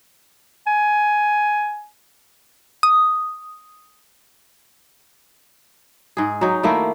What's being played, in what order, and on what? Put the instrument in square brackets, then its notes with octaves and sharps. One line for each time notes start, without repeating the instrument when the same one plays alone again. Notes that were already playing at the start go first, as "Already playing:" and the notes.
[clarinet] G#5
[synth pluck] D#6
[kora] G#2 G#4
F#3 D#4
D#3 A3 A#3 E4